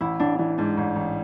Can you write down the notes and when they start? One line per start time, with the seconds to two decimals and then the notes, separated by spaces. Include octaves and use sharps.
0.01 A1 E4
0.20 A1 D4
0.39 E3 D4
0.58 G#2 D4
0.77 A1
0.96 A1